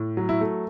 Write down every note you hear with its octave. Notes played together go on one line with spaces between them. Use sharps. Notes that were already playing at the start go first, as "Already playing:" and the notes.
Already playing: A2
F#3
E4
A3